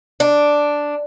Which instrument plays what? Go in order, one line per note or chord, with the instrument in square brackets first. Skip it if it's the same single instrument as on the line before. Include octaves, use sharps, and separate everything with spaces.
[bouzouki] D4